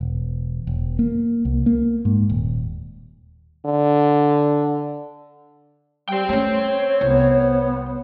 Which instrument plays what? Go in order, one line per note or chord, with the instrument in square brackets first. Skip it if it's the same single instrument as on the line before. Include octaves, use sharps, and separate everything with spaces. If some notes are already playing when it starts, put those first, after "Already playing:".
[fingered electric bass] E1
E1
A#3
C2
A#3
G#2
D#1
[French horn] D3
[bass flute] G3 [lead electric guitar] C5 G5
[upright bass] A3 C#4 [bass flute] C#5
[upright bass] C2 [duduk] B3